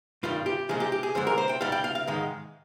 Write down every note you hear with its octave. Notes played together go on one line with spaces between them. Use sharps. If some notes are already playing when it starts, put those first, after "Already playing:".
G2 D#3 G3 F4
G4
A#2 F3 G#3 G#4
G4
G4
G#4
F2 D3 G#3 C5
A#4
C5
G5
G#2 G3 F5
G5
F5
F5
G#2 D#3 G#3